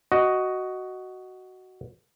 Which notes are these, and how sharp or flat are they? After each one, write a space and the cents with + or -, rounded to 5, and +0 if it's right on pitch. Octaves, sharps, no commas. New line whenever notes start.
F#4 +10 D#5 +0